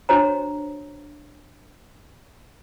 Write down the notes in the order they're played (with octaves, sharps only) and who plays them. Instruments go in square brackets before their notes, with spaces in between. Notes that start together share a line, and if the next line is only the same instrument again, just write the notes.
[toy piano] D4 F#4 C5 C#5 A#5